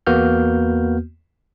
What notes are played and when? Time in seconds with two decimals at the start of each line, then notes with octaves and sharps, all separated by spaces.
0.07 E2 A#3 B3 F#4 F6 G6